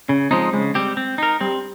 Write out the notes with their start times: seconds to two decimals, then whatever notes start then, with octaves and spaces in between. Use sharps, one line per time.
0.09 C#3 C#4
0.31 F3 G#3 C4 D#4
0.53 C#3 G#3
0.75 G3 C4 G4
0.97 C4
1.18 D#4 A#4
1.41 G3 C4